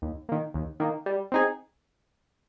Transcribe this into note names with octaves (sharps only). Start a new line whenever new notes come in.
D#2
D#3 A#3
D#2
D#3 A#3
G3
C4 D#4 G#4